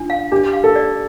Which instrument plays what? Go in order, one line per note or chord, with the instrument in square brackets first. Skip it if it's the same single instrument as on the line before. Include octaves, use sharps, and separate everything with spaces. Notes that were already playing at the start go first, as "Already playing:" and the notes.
Already playing: [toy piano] D4 [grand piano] F4
[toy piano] F5
[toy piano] D4 [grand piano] G4
[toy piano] F5
[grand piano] A4
[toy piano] D5